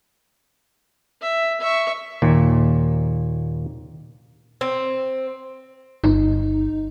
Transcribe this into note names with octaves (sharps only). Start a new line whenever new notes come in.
E5
E5 C#6
D#2 A#2
C4
G1 D#4